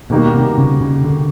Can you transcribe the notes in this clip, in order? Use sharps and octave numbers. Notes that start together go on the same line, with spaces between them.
B2 D#3 G3 A#3 D#4 F#4
C3
C#3
C#3
D3